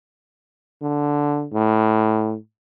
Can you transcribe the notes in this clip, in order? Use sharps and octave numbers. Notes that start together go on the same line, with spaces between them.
D3
A2